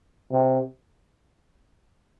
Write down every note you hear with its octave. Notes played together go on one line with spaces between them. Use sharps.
C3